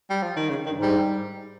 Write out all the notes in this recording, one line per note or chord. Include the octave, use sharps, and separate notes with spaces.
G3
F3
D#3
C#3
G2 D#3
G#2
G3